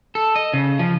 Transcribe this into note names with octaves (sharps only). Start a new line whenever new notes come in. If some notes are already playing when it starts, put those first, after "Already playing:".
A4
D#5
C#3
F3